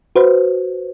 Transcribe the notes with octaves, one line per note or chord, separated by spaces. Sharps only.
F#4 B4 C5